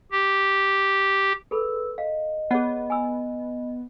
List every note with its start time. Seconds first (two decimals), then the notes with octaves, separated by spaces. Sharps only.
0.12 G4
1.51 G#4 A4 B4 B5 E6
1.98 D#5 F5
2.51 B3 G#4 C#5 F#5
2.90 G#5 B5 E6